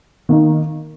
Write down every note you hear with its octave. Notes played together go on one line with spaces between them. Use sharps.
D#3 A#3 D#4